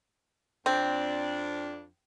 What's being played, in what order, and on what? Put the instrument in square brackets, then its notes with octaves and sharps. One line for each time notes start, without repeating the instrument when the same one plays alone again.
[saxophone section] F2 D4 [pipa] C4